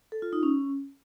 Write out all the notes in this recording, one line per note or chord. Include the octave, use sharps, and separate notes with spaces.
A4
F4
D#4
C#4